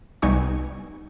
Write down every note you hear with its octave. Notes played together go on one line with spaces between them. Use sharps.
C2 G3 B3 D#4 G#5 C#6